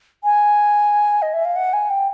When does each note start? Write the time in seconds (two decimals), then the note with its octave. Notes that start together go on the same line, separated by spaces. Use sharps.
0.24 G#5
1.22 D#5
1.34 E5
1.45 F5
1.56 F#5
1.73 G#5
1.90 G5